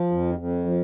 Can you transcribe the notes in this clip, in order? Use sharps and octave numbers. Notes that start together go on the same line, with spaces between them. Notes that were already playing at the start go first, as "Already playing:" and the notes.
Already playing: F3
F2
F2
F3